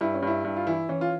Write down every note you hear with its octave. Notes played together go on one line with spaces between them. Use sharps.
G2 E4
C#4
G2 E4
G2
F4
E3 E4
E3 C#4
F4